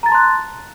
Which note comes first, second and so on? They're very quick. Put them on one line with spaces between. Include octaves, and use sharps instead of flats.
A#5 A6 A5 C6 F#6